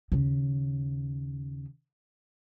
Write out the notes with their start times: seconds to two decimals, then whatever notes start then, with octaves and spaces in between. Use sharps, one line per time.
0.12 D#2 C#3